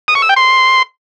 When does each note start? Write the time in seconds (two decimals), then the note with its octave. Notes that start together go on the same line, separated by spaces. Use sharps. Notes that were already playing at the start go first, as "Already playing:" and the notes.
0.08 D#6
0.15 C#6
0.22 E6
0.29 G5
0.36 C6